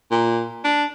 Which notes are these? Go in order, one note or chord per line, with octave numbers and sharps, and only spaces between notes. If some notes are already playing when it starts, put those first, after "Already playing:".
A#2
D4